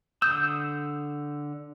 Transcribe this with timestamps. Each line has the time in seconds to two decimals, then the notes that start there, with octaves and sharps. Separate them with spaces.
0.22 D3 D#6 E6 G6